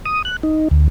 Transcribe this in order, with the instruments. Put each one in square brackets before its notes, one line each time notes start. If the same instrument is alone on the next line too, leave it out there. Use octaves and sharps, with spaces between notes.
[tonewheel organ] D#6
F#6
D#4
D2